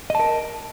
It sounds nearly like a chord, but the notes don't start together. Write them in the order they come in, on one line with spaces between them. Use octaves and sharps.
D#5 A5 A#4